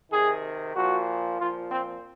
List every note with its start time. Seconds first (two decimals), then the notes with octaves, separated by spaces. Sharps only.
0.11 C3 D#3 G#4
0.75 A#2 F3 F#4
1.38 A#2 F3 F4
1.70 C4